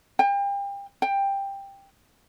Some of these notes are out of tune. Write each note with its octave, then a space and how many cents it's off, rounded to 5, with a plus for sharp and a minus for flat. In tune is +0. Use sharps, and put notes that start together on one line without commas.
G5 +35
G5 +10